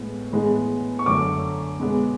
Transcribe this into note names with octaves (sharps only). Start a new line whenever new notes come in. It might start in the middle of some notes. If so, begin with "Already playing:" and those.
Already playing: A2 G#3 B3
A2 E3 G#3 B3
C#6
F#2 D3 A3 D6
B2 G#3 B3